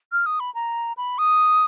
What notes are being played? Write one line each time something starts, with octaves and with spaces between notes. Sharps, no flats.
F6
D#6
B5
A#5
B5
D#6